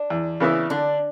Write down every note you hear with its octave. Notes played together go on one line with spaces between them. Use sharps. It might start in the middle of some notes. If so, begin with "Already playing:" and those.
Already playing: D4
E2
C#3 E3 B3 E4
D3 D4